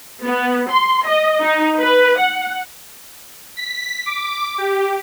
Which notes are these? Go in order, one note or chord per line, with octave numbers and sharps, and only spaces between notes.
B3
C6
D#5
D#4
B4
F#5
B6
D6
G4